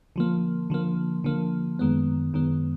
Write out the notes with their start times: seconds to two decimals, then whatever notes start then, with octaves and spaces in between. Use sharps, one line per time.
0.16 D3 F3 A#3
0.70 D3 F3 A#3
1.24 D3 F3 A#3
1.79 F#2 D#3 G#3 B3
2.33 F#2 D#3 G#3 B3